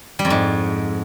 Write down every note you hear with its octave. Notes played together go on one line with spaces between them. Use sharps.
G3
F2
G#2